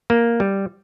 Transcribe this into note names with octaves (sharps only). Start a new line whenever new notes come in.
A#3
G3